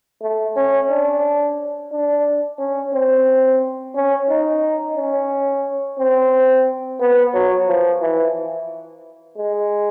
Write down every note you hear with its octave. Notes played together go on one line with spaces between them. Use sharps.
A3
C#4
D4
D4
C#4
C4
C#4
D#4
C#4
C4
B3
F#3
F3
E3
G#3